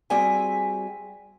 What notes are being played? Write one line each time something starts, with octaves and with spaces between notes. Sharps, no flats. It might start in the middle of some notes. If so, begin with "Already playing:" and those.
G3 C4 F#4 G#4 E5 G#5